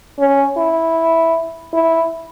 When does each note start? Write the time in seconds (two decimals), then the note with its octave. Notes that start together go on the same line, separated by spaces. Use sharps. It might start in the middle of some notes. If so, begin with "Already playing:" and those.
0.19 C#4
0.58 E4
1.74 E4